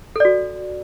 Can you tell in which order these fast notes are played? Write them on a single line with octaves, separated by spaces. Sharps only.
A4 D5 F#4